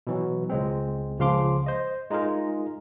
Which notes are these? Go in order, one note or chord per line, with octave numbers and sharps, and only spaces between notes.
B2 E3 F#3
C#2 G#3 C4
C#2 C#3 F3 F5 C6 D6
C5 D#5
G#3 D#4 F4 G#4 A#4